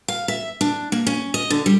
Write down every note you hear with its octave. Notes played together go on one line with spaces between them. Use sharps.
F5
E5
D4
A#3
C#4
D#5
D3
G3